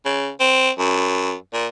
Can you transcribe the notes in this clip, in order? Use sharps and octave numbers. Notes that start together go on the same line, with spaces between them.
C#3
C4
F#2
A#2